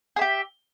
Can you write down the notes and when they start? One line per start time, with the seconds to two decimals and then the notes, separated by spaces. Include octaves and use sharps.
0.16 G#4
0.19 E5
0.21 G4